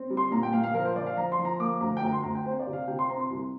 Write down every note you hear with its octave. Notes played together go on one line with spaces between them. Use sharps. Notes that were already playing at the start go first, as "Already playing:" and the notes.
Already playing: C4
G3
C6
A#2 A#5
G5
A#2 F5
F5
F3 A#4
C5
F3 D5
F5
F3 A#5
C6
F3
A#5
A#3 D6
D2 A#5
G5
D2 A#5
C6
D2 A#5
G5
C4 C5
D5
C3
F5
C3 G5
C6
C4 A#5
C6
C2